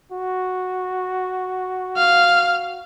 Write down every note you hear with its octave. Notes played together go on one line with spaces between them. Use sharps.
F#4
F5